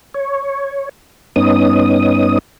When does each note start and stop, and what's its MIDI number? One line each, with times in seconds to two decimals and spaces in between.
0.14 0.89 73
1.36 2.38 43
1.36 2.38 59
1.36 2.38 61
1.36 2.38 63
1.36 2.38 87